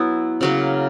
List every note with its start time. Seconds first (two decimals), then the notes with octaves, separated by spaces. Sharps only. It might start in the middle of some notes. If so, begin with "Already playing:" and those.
Already playing: F#3 B3 E4
0.41 C#3 F#3 A#3